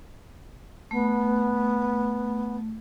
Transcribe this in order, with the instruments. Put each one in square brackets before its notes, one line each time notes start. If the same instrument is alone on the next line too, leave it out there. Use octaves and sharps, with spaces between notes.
[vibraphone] A3 [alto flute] B3